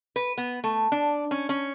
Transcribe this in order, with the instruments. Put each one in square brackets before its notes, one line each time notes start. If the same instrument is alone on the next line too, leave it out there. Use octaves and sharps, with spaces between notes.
[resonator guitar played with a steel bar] B4
B3
A3
D4
C#4
C#4